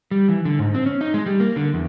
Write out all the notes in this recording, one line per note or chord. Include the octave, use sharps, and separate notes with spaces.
G3
E3
D3
G#2
C4
C#4
D#4
G#3
G3
A#3
D3
E2